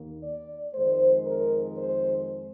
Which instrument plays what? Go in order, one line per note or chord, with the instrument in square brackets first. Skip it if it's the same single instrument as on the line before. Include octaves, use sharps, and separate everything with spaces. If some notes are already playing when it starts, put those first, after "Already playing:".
Already playing: [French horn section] D#2 D#3 A#3
D5
F2 D#3 G#3 C5
A#4
C5